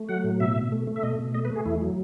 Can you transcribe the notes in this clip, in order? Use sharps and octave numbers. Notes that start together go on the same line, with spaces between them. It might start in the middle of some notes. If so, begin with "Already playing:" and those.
Already playing: A3
F#3 F#5
A2
B2 E5
B2
A3
A3
E5
B2 D#5
B2
A3 D#5
B4
A3
G#4
E2 E4
F#3